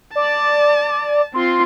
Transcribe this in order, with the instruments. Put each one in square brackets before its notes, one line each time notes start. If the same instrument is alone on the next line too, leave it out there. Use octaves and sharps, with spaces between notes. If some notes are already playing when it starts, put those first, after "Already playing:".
[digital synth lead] D5 [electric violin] A5
[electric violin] C4 F4 [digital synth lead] C6